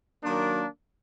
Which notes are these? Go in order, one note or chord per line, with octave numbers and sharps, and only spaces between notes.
D#3 F#3 A#3 D4